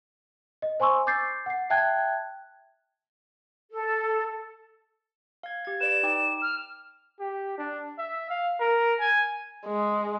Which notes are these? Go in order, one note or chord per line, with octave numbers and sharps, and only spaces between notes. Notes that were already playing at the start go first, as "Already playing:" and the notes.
D#5
C5 G#5 C6 C#6 E6
D6 G6 A6 C7
F#5 C7
E5 G5 A5 F#6 G#6
A4
F5 G#6
G4 G#6
B4 D5 D7 E7
D#4 G5 D6
F6
G4
D4
E5
F5
A#4
G#5
G#3